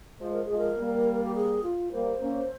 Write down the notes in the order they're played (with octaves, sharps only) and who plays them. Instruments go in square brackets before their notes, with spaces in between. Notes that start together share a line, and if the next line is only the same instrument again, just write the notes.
[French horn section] F3 G#3 [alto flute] C5
[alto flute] A#4
[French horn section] F3 G#3 [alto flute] G#4
[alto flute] A#4
[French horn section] G3 A#3
[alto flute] G4
G#4
F4
[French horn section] G3 A#3 [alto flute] C5
[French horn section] A#3 C#4